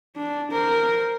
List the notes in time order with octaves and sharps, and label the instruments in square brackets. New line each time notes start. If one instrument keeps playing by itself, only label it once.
[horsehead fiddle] D4
A#4 C5